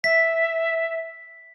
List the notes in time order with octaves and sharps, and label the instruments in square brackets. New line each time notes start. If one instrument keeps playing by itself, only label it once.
[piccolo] E5 [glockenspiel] B6